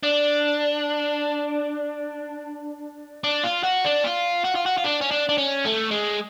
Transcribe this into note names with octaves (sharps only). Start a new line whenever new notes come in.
D4
D4
F4
F#4
D4
F4
F#4
F4
F#4
F4
D4
C#4
D4
D4
C#4
A3
G#3